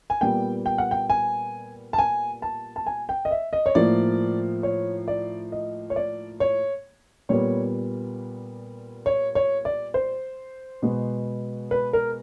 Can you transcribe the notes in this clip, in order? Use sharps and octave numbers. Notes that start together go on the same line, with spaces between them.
G#5
A#2 G3 B3 G5
G5
F#5
G5
G#5
A5
G#5
A5
A5
G#5
G5
D#5
E5
D#5
C#5
A2 F3 A#3 D5
C#5
D5
D#5
C#5
D5
C#5
A#2 G3 B3 C#5
C#5
C#5
D5
C5
B2 G#3 B3
B4
A#4